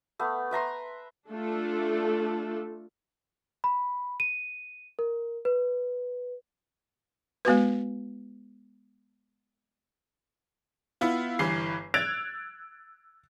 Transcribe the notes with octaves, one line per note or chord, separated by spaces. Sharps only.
A3 B3
B4 E5 A#5 C6
A3 D4 F4 A4
B5
D#7
A#4
B4
G#3 B3 F#4 B4
B3 E4 F4
G1 G2 E3 C7
E6 F#6 G#6 A6 D7 F7